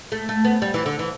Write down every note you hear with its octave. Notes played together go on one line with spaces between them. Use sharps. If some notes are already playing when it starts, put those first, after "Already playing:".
A3
A3
B3
G3
E3
D3
E3